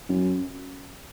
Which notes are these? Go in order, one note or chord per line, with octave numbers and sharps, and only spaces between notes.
F#2